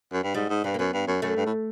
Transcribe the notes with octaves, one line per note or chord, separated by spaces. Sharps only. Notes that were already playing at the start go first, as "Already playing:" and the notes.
F#2
G2
G#2 G3
G#2
G2 B3
A#3
F#2 B3
G2
F#2
F#2 A3
G2
A2